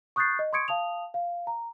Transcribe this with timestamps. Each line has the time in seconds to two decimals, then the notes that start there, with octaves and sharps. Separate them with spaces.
0.16 C#6 D#6 F#6 G6 A6 C7
0.39 D#5
0.53 C6 C#6 D#6 G#6 C#7 D7
0.68 F5 A5 D#6 F7
1.14 F5
1.47 A#5